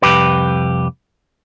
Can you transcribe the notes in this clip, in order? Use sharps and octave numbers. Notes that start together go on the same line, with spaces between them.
C2 F2 G4 B4